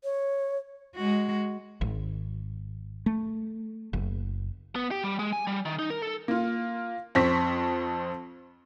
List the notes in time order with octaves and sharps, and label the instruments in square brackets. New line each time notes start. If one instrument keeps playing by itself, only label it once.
[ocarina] C#5
[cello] G#3 F#4
[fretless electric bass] G#1
A3
F#1
[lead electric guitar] B3
G4
G3
G#3
G#5
G3
D#3
D#4
A#4
A4
[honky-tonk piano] A#3 F4
F2 C4 C#6 B6